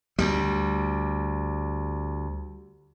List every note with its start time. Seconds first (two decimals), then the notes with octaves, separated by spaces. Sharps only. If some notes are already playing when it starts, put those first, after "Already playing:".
0.19 D2 G3